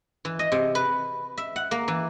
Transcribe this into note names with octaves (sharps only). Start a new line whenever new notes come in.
E3
D#5
C3
B4
E5
F#5
A#3
E3